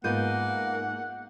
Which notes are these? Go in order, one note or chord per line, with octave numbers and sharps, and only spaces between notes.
G#2 A#3 B3 F4 F#5 G6 D#7